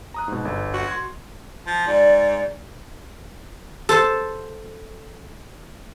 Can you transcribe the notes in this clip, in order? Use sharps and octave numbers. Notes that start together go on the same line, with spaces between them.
A#5 D#6 F#6
G#2 B2
G1
F#4
C6 G#6
F3
G#2 D5
A4 C5 A5